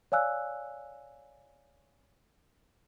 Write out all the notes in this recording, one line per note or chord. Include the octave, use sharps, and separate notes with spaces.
C#5 D5 F5 G#5 E6 F#6